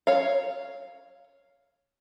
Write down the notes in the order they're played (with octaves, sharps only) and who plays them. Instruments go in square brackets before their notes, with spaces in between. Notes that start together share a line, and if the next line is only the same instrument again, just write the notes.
[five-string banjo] C#5 F5